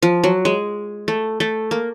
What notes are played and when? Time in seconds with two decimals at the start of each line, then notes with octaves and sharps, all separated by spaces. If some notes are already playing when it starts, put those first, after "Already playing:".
0.02 F3
0.24 F#3
0.45 G#3
1.08 A3
1.40 A3
1.71 A#3